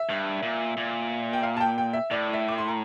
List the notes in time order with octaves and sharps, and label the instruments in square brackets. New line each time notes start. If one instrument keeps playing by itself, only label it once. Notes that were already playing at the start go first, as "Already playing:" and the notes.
Already playing: [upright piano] E5
[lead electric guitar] G2
A#2
A#2
[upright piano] G5
F5
A5
G5
G5
E5
[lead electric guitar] A2 [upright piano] D5
[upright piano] E5
D6
C6
A#5